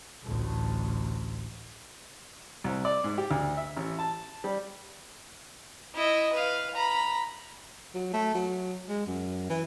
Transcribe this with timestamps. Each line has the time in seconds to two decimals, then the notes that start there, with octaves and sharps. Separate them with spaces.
0.24 A1 D2
2.64 C2
2.85 D5
3.04 G#2
3.18 G4
3.31 D2
3.57 E5
3.76 A1
3.99 A5
4.44 G3
5.95 E4 D#5
6.33 B4 F5
6.75 A#5 B5
7.95 F#3
8.13 A3
8.35 F#3
8.89 G#3
9.06 F#2
9.50 E3